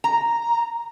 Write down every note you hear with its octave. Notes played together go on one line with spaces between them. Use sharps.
A#5